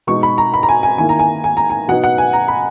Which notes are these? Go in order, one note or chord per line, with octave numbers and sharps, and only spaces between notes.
B2 G#3 D#4 C#6
B5
A#5
B5
A#5
G#5
G#5
D#3 A#3 E4 G#5
A#5
G#5
G#5
A#5
G#5
B2 F#3 B3 D#4 F#5
F#5
G#5
A#5
B5